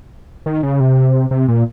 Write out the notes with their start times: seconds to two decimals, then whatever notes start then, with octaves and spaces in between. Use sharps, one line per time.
0.46 D#3
0.63 C#3
0.80 C3
1.31 C3
1.48 A#2